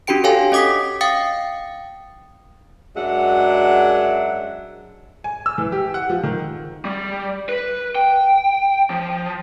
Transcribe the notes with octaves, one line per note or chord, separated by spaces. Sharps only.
C#4 D4 F#4 G4 G5 D7
G4 A4 C#5 F5 G5 G#5
C#4 D#5 D6 D#6 B6
F5 G5 D#6 A6 C#7
F#2 F#3 G#3 D4 E5 F#5
G#5
E6
E3
G4
F#5
F3
D#3
G3
B4
G5
F3